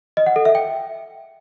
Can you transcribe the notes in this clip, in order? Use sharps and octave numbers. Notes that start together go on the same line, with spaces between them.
D#5
F#5
A4
E5
G5